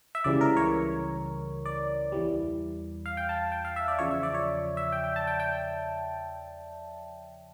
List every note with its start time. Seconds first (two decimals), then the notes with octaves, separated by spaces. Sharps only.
0.15 E5
0.24 C#2 C#3 E3 G3 D5
0.41 A#4
0.57 C#5
1.66 D5
2.12 E2 E3 G3
3.06 F5
3.17 G5
3.29 A5
3.52 G5
3.65 F5
3.76 E5
3.88 D5
3.99 E2 C#3 F3 C#5
4.11 E5
4.23 D5
4.34 C#5
4.77 E5
4.92 G5
5.04 G5
5.16 A5
5.27 G5
5.40 G5